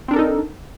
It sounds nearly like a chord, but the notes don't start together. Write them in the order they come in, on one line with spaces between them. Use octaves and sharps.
C4 D4 A#4 A4 D#4